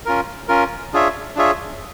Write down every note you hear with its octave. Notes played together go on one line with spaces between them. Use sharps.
C#4 F4 A#4
C#4 F4 A#4
D4 F4 G#4 C#5 E5
D4 F4 G#4 C#5 E5